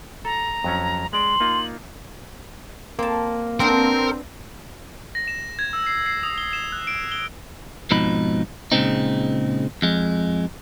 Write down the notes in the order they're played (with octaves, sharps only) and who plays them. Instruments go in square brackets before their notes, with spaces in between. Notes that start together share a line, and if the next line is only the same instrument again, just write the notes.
[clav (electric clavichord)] A4 [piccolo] A#5
[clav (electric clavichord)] F2 F#3 C#4
[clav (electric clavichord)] G#3 D5 [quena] C6 [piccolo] F#7
[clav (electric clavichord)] A#3 D#4 F4
[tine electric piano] A#3 [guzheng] C4 A5
[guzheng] B3 D4 C5 [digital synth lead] C4 [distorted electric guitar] A#4
[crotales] A#6
E7
G#6
E6
C7
C7
D#6
G7
E7
F#6
D7
G7
[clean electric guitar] F2 G#2 B2 F3 D#4 B5
A#2 C#3 F3 G#3 C4 D#4
F2 G#3